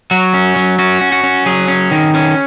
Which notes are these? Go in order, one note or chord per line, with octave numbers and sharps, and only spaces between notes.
F#3 F#4
C#4
F#3
C#4 F#4
C#4
F#4
C#4
F#3 G#4
C#4
D#3
C#4